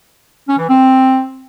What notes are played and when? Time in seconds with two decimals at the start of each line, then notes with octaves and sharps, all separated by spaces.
0.48 C#4
0.58 E3
0.68 C4